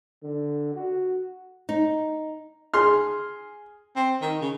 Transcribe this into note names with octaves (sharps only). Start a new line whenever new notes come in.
D3
F#4
D#4
G#4 C6 F6
C4
D#3
C#3